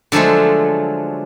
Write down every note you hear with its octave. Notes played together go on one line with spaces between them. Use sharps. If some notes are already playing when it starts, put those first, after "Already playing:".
D3 F3 F#3 G#3 A3